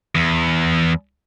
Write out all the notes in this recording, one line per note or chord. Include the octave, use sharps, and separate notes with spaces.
E2